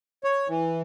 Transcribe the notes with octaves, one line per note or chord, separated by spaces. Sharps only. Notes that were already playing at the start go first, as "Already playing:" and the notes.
C#5
E3